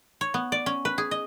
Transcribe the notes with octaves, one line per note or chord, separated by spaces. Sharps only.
C#5
B3
D5
C#4
B4
G#4
D#5